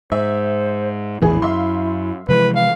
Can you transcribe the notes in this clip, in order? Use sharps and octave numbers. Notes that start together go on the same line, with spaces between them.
G#2 C5 E5
A#1 E2 A2 E3 E4 G#4
F#2 E5 F5 C6
C3 E3 F3 G#3 B4
F5